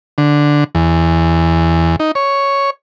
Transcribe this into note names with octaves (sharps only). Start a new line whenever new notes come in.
D3
E2
D#4
C#5